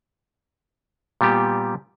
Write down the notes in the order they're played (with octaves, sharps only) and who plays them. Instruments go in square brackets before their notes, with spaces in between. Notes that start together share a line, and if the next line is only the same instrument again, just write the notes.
[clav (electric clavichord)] A#2 G3 B3 G4